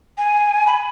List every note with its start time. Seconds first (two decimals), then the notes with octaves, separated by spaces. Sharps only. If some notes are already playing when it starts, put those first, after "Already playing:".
0.18 G#5
0.67 B5